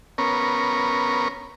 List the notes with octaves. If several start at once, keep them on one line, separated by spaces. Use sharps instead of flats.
B3 C#4 A#4